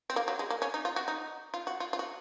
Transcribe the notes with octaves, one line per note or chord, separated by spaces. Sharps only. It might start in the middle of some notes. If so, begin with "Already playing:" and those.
C4
A#3
F#3
G#3
A#3
C#4
D#4
F4
F#4
D#4
F4
F#4
F4
F4
F#4